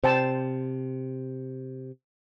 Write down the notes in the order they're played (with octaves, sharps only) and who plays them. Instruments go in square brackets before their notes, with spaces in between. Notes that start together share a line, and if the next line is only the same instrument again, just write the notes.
[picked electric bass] C3 [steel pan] C5 G5 A5